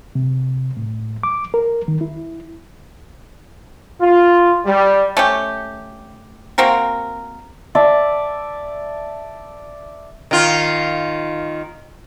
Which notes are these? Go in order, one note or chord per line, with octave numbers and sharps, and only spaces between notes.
C3
A2
D6
A#4
D#3
E4
F4
G3
A3 C#4 G4
A#3 C4 F#4 A#4
D5 E5 A5
D#3 F4